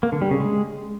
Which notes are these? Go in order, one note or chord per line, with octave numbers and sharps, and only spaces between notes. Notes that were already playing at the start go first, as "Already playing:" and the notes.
A#3
D3
G3
C#3
G#3